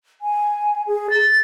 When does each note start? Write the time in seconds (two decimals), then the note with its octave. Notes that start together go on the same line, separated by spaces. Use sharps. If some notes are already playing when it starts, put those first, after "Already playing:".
0.21 G#5
0.87 G#4
1.11 A6